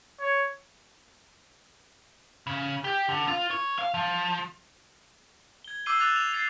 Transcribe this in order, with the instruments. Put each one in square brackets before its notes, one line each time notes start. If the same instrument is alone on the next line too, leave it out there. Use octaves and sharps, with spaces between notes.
[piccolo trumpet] C#5
[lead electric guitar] C#3
G4
D3
F4
C#5
F5
F3
[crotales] G#6 G7
D6 E6 G6 C7 D#7 G7
D6 F#6 A6 F7
F7 G7
A6 C7 F7